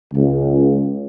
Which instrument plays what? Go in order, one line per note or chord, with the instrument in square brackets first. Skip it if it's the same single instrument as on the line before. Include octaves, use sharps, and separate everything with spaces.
[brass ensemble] C#2